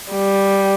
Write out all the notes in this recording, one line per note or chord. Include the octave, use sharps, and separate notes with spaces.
G3